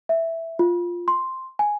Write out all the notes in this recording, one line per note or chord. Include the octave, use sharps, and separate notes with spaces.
E5
F4
C6
G#5